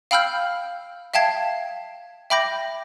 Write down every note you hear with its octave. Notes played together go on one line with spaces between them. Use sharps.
F5 G5 B5 E6 F6 G6
E5 F5 G5 A5 G#6 C7
E5 G5 B5 D6 G6 A#6